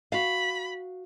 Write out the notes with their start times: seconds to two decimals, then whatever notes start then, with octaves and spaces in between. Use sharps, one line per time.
0.12 F#4 F5 B5